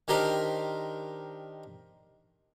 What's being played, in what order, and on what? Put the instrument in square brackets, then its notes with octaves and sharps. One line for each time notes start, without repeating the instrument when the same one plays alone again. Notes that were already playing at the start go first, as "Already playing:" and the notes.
[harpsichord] D#3 D4 G4 A#4 C5